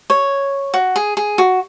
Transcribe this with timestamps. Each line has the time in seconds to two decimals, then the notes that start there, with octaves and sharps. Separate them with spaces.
0.10 C#5
0.74 F#4
0.96 G#4
1.17 G#4
1.38 F#4